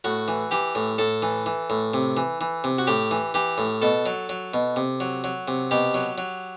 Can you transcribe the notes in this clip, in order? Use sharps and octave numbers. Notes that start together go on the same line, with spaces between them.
A2 F#4
E3
E3 G4
A2
A2 A4
E3
E3
A2
C3
E3
E3
C3
F#4
A2 G4
E3
E3 G4
A2
B2 A4
F#3
F#3
B2
C3
F#3
F#3
C3
B2 G4
F#3
F#3